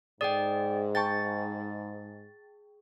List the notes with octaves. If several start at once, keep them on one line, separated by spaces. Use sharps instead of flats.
G#2 G#4 D5 G5 D#6
G5 A5 C#6 A6